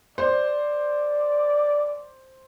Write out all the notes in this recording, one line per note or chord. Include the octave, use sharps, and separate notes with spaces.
C5 D5